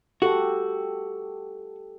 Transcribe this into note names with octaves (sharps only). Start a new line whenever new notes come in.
F#4 G4 A4